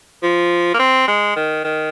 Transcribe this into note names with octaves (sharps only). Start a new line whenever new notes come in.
F3
A#3
C4
G#3
D#3
D#3